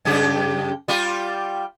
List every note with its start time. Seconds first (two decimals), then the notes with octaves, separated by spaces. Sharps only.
0.05 F#2 C#3 G4
0.88 G3 F4 G4